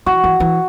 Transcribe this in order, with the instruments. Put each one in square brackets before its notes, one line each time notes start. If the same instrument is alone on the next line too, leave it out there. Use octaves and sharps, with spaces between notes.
[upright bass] E3 [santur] F#4
[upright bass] E3
E3